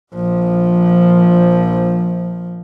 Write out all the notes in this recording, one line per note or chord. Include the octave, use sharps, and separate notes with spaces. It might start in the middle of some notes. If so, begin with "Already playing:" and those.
A#1 F3